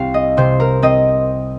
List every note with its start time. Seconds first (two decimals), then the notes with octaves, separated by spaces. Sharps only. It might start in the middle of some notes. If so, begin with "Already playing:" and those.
Already playing: C2 C4 F5
0.14 D#5
0.37 C3 C5
0.60 A#4
0.82 C4 D#5